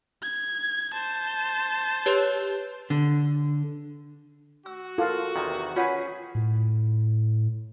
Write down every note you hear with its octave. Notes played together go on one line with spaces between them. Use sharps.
G#6
C5 A5
G4 B4 C#5
D3
F#4 E6
E4 F4 A4 A#4
E2 C3 D#3
C#4 F4 G#4 B4 C#5 F#5
A2